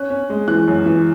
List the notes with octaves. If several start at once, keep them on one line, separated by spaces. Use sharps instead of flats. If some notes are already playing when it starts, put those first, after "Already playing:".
Already playing: C#4 F#6
C#4
G#3
E3 F#6
F#2
E3